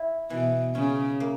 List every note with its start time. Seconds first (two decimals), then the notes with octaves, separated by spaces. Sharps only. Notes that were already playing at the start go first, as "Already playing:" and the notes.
Already playing: E4
0.30 B2 E3
0.75 C#3 C#4
1.20 A#3